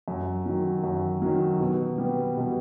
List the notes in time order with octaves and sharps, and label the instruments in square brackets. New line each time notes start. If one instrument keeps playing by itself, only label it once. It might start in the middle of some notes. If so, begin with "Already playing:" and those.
[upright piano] F#2
D#3 F#3
F#2
D#3 F#3
B2
G3 B3
B2